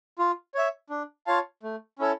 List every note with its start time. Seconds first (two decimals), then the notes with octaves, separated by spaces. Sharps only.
0.19 F4
0.55 C#5 E5
0.90 D4
1.27 F4 C#5 F5 A5
1.63 A3
1.99 C#4 E4 A4 C#5